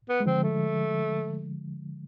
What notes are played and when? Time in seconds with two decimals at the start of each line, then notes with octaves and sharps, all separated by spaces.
0.09 B3
0.20 G#3
0.26 D3 F3 C4
0.43 A3